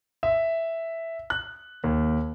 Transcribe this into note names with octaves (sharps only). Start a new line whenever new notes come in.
E5
F#6
D#2